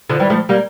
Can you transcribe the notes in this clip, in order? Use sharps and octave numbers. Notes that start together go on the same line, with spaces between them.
D3 F3
E3 G3
F3 A3
G3 A#3